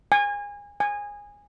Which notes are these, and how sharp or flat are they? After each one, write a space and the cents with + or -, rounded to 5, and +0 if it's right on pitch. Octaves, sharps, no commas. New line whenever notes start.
G#5 -25
G#5 -15